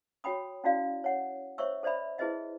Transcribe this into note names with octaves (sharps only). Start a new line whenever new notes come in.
F#4 C#5 G5 B5 D#6
C#4 E4 F#4 D5 F5
C#5 F#5
C5 C#5 E5 C#6 E6
A4 C5 D5 E5 B5
E4 G#4 B4 C5 D#5 E5